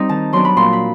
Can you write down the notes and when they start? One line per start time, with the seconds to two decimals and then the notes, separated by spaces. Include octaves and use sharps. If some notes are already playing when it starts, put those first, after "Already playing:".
Already playing: G3 C4 D#4
0.09 D#3 A5
0.33 F#3 B3 D4 C6
0.45 B5
0.57 A#2 C6
0.73 B5